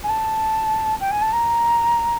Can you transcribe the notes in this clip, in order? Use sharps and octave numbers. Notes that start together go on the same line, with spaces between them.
G#5
A5
G5
G#5
A5
A#5